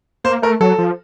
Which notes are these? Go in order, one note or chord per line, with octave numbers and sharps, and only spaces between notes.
A#3 C5
A3 A#4
F#3 A4
F3